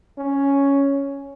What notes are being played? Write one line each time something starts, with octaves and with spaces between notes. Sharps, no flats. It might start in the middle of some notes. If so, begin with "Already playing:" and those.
C#4